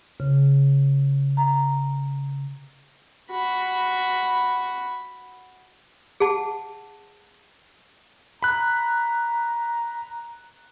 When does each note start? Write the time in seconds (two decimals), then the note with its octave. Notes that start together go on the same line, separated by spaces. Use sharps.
0.20 C#3
1.37 A#5
3.31 F#4 B5
6.20 G#4 F#5 A5
8.43 A#5 B5 F#6